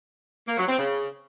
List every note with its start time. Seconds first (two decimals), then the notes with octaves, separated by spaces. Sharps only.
0.47 A#3
0.58 F#3
0.68 C4
0.79 C#3